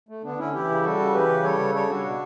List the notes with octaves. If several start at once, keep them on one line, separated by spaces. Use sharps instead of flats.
A3
D3 B3 D4
D3 C#4 E4
E3 E4 G4
C#3
G3 F#4 A4
C#3
E3 G4 B4
C#3
G3 A4 C#5
C#3
G3 A4 C#5
G3 D4 F#4
B2